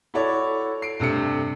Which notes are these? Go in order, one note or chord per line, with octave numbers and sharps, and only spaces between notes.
E4 F#4 A4 C#5 D5
C7 D7
G2 C3 A3 C#7